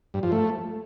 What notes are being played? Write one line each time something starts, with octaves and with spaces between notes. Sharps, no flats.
G2
F3
A3